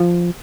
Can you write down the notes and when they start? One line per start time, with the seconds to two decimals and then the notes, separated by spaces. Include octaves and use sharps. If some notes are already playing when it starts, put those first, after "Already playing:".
Already playing: F3